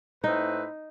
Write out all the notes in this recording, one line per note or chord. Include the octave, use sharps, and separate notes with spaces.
A2 C4 D#4 B4